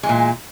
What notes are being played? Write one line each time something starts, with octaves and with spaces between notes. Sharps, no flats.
A#2 E3 G#3